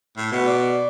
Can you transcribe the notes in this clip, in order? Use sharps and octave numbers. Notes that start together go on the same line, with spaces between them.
A2
B2
D5